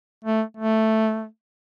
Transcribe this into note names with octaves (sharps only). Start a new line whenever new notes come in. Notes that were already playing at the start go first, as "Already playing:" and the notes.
A3
A3